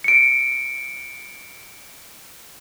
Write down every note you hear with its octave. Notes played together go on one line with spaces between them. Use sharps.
C#7 D7